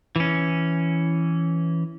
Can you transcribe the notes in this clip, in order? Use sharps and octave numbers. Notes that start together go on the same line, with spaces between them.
E3 C#4